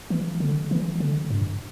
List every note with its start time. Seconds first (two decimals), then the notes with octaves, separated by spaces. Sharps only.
0.10 E3
0.40 D3
0.71 E3
1.00 D3
1.30 G2